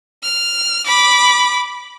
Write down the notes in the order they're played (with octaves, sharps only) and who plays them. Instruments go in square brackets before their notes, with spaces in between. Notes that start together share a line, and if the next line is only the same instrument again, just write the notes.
[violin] F6
B5 D6